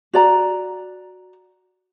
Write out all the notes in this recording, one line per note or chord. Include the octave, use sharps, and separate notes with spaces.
F#4 D5 A#5